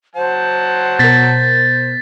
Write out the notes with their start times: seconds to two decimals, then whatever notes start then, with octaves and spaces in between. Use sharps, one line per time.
0.16 F#3 C5 F#5 A5
0.99 B2 A#4 A6 B6